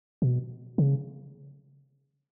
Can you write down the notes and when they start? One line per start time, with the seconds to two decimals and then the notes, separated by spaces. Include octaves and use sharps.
0.22 B2
0.78 C#3